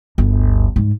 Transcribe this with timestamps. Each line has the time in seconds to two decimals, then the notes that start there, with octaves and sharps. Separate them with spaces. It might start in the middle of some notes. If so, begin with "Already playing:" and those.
0.18 G1 D2
0.76 G#2